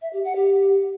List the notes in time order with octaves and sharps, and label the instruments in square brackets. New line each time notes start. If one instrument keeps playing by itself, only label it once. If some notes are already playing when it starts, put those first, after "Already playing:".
[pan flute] E5
G4
F#5
G4